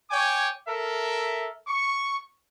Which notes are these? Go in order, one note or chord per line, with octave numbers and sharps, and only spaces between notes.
C#5 G5 G#5 D6
A4 A#4 E5
C#6